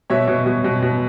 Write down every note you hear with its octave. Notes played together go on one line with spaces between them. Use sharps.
B2 C#5 E5
B2
B2
B2
B2